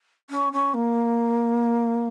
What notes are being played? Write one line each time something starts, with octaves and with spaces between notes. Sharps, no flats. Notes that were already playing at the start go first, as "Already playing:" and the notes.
C#4
C#4
A#3